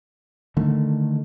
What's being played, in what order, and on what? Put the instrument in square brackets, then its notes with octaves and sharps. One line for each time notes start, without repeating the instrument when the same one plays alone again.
[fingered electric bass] D3 D#3 A3